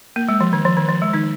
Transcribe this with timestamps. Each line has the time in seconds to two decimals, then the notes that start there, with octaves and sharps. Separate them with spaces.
0.16 A#3
0.29 G#3
0.41 F3
0.53 D#3
0.65 F3
0.77 D#3
0.89 F3
1.02 G#3
1.13 D#3 D#4